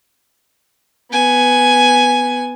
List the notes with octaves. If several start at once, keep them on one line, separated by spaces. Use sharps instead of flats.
B3 G#5